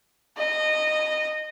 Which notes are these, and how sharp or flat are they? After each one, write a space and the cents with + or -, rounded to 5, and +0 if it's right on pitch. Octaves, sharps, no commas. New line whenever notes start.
D#5 -15